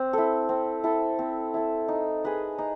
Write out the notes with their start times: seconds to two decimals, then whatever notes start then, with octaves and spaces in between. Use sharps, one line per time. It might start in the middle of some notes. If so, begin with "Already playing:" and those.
Already playing: C4
0.13 E4 A4
0.49 C4
0.84 E4 A4
1.19 C4
1.54 E4 A4
1.88 D#4
2.24 G#4 B4 D#5
2.58 D#4